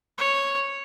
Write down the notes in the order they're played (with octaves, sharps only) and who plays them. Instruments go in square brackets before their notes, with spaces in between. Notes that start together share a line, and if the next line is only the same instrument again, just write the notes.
[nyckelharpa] C#5